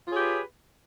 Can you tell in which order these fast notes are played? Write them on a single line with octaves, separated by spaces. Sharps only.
F4 G#4 C#5 G4 B4